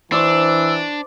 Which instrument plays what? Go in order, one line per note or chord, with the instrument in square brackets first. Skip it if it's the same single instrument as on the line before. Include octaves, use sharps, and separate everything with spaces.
[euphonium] E3 [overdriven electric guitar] D4 [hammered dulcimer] C5 D5 C#6 [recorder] E6